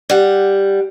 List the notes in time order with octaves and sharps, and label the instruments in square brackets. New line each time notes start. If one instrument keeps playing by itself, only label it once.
[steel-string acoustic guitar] G3 F#5